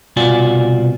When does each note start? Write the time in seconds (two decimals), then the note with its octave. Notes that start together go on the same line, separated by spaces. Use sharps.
0.16 C2 B2 F4 F#4 D5 G#5